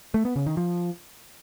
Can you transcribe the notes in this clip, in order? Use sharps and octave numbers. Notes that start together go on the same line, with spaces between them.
A3
B3
C#3
D#3
F3